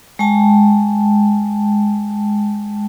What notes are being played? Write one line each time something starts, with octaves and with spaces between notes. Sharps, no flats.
G#3 G5 A5